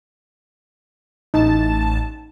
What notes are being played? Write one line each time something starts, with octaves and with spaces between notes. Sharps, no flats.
A1 D#4 A5